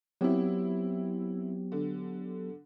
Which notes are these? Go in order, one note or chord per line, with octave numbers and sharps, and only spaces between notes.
F#3 B3 C4 E4 G4
D3